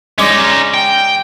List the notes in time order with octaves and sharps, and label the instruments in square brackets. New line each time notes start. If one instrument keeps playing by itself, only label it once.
[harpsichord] G#3 D5 [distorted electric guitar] C#4 D#4
[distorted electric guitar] G5